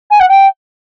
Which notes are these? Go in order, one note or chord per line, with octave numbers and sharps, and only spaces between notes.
G#5
F#5
G5